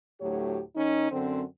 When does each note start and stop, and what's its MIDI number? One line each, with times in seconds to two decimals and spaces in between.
0.21 0.61 38
0.21 0.61 45
0.21 0.61 54
0.21 0.61 67
0.21 0.61 73
0.76 1.09 51
0.76 1.09 61
0.76 1.09 63
1.11 1.43 42
1.11 1.43 50
1.11 1.43 60